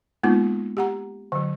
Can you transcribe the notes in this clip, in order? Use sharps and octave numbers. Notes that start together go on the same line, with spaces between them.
G#3 A#3 B3 D#4 F4
G4 F#5 A#5
D3 F#3